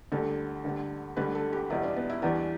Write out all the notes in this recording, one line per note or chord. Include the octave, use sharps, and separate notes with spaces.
D2 D3 G3 A4
D2 D3 G3
D2 D3 G3 B4
A4
G4
E2 B2 G3 E4
D4
B3
E4
E2 E3 G3 D4